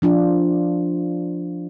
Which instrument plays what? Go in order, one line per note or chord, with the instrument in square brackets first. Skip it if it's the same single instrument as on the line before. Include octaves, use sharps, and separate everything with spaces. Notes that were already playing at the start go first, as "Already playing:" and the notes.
[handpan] F3 D4 F4